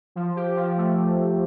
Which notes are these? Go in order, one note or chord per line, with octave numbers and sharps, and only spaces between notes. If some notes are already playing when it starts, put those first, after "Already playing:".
F3
G4
F3
A3